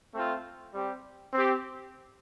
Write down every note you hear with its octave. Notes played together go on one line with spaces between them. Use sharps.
A3 C4 F4
G3 C4 G4
C4 G4